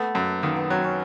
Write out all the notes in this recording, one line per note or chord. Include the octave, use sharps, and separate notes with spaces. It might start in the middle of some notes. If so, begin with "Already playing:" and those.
Already playing: A3 B3
F#2
D#3 A#3
B3
F#3 C4
C#4